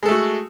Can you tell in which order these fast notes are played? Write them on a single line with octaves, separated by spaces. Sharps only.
G#3 A4 A3 F#4